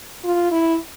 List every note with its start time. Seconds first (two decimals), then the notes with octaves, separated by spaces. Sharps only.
0.24 F4
0.52 E4